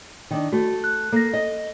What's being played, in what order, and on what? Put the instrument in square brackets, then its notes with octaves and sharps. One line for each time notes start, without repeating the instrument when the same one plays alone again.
[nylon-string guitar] D#3 D4
[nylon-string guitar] A3 [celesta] F#4
[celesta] F#6
[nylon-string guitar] A#3 [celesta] A4 A#6
[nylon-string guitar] D#5